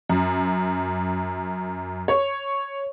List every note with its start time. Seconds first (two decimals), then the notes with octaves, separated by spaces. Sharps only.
0.10 F#2
2.08 C#5